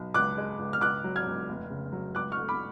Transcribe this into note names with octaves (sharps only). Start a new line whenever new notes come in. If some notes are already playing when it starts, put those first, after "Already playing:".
Already playing: B1
C#2 D6 F#6
G#3
C#2
F6
C#2 D6 F#6
F#3
F6 G#6
C#2
F1
C#3
F#3
C#2 D6 F#6
C#6 F6
A3
B5 D6